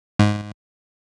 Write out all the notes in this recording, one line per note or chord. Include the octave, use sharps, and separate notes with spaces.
G#2